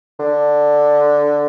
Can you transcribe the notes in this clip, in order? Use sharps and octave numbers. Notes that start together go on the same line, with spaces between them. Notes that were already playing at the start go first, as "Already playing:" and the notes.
D3